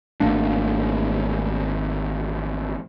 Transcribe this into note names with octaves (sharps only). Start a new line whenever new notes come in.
G#1 A3 A#3 D4